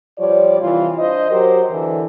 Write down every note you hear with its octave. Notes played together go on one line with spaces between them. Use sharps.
F3 G3 C#5 D5
C3 E3 G3 F4
D4 C5 D#5
F#3 G4 A#4 C5
E2 D3 E3